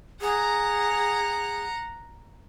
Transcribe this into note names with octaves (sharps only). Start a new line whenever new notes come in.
G#4 F#5 A#5